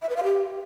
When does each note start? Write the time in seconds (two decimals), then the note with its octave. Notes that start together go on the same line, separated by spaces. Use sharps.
0.02 E5
0.09 B4
0.16 F5
0.24 G4